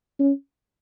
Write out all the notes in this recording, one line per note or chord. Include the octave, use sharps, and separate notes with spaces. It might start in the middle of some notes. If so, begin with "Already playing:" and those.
C#4